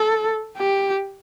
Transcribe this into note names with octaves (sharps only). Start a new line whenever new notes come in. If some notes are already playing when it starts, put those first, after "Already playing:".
Already playing: A4
G4